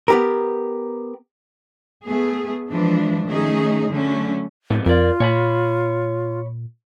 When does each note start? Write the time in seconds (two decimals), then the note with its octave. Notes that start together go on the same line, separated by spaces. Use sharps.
0.08 B3 G4 A#4
2.05 A3 B3 G#4
2.71 E3 F3 G#3 D4
3.28 D#3 A3 C#4 D#4 G#4
3.90 D3 F#3 A3 C#4
4.70 F2 A2 C3 B3
4.86 F2 F4 A#4 D5
5.20 A#2 C#5 G#5 B5